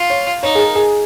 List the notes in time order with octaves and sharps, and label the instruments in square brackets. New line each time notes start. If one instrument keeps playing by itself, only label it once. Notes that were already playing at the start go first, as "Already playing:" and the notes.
Already playing: [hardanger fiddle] F4
[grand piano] C#5
[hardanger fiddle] D#4 [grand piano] C#5
[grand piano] G#4
A#4
G#4